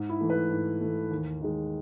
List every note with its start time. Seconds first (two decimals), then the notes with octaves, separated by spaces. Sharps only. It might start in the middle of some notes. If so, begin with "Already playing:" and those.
Already playing: G#2
0.09 E4
0.21 E3 A3
0.30 B4
0.50 G#2
0.81 E3 A3
1.11 D#2
1.42 D#3 G#3